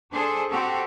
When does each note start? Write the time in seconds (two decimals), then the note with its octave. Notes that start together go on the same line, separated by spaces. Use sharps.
0.12 D4 G#4 A4 C5
0.50 C4 F#4 G4 A4